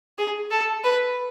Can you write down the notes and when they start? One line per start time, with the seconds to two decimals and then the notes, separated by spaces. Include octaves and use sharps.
0.19 G#4
0.51 A4
0.84 B4